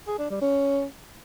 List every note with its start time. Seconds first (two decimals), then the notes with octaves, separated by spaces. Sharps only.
0.07 G#4
0.19 D4
0.30 G3
0.42 C#4